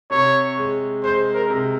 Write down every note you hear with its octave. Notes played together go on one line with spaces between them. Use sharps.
C3 C#5
G#3
G#3 C5
A#4
C3